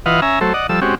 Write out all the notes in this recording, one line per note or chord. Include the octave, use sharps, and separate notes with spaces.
E3 F4 B4 D#5 F5 F#5
C#4 E5 G#5 A#5
F#3 A3 A4 C5
D5 D#5 F#5
F3 G3 A4 E6
G#3 C4 C#4 F#4 G4